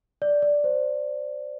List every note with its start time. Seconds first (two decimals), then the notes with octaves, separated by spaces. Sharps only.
0.22 D5
0.42 D5
0.64 C5